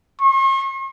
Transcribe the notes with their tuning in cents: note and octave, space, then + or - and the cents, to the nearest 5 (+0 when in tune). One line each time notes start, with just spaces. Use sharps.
C#6 -45